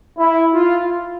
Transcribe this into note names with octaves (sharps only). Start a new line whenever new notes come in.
E4
F4